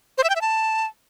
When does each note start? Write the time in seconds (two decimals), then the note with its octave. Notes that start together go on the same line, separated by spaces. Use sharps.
0.18 C5
0.24 E5
0.30 G5
0.35 E5
0.41 A5